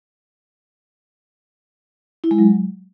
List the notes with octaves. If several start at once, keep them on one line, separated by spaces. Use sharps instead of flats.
E4
G#3
F#3